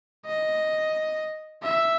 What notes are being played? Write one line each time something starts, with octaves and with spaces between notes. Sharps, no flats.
D#5
E5